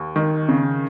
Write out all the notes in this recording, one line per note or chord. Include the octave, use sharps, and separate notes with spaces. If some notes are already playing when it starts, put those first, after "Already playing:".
Already playing: D#2
D#3
C#3